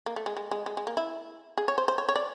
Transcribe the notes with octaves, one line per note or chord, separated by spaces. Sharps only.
A#3
A3
G#3
G#3
G#3
G#3
G#3
A#3
E4
G#4
C#5
C5
C5
C#5
C#5
D5